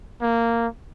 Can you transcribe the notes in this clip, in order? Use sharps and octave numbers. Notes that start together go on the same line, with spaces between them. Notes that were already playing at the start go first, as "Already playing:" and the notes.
A#3